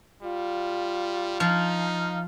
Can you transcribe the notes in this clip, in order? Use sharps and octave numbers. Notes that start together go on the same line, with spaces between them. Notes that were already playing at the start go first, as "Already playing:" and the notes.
G3 F4
F3 D#4 F5